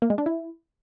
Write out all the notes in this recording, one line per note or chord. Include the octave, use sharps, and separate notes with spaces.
A#3
G#3
D4
E4